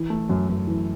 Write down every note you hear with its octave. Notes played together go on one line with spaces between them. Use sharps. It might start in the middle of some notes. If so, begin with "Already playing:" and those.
Already playing: E3
A3
F#2
F#2
E3